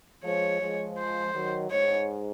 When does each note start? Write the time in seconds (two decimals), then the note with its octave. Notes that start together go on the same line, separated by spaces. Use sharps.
0.24 F3 G#3 C#5
0.61 F3 G#3
0.98 C5
1.34 D#3 F#3
1.70 G#2 C#5